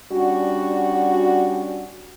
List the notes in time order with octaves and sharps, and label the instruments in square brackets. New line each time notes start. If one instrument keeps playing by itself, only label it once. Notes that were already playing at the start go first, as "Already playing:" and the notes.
[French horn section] G3 C#4 D4 F#4